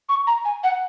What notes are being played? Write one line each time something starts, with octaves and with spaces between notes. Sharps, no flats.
C#6
A#5
G#5
F#5